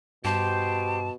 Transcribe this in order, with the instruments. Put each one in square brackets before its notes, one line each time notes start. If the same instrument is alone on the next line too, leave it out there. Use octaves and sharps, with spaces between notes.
[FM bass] G2 [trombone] B2 [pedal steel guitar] G4 C5 [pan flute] A5